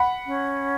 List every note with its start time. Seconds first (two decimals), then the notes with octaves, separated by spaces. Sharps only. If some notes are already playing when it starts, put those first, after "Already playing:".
Already playing: F#5 B5
0.26 C#4